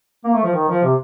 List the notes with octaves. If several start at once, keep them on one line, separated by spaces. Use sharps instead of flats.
A#3
A3
F3
D#3
F3
C3